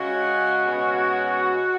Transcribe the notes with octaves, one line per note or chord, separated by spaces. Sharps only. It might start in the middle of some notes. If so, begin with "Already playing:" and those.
Already playing: C#3 G#3 C#4 F#4
B2 G#3 C#4